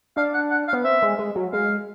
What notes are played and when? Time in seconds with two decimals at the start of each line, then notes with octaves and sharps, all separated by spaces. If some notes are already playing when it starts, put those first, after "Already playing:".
0.17 D4 F5
0.34 F#5
0.51 F#5
0.68 F5
0.73 B3
0.85 C4 E5
1.02 G#3
1.18 G#3
1.35 F#3
1.53 G#3 F5